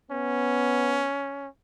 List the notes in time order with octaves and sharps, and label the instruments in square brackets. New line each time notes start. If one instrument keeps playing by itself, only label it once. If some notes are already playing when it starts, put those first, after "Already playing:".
[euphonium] B3 [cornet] C#4